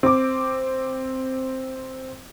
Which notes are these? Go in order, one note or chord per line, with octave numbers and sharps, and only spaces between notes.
C4 D6